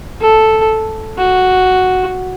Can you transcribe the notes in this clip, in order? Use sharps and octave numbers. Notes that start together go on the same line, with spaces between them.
A4
F#4